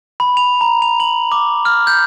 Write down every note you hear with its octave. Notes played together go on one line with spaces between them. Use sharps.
B5
F7
A#5
F7
F#7
D6
F6
G6